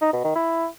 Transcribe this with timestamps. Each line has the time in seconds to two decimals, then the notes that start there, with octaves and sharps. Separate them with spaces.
0.01 D#4
0.13 B2
0.24 D#3
0.36 E4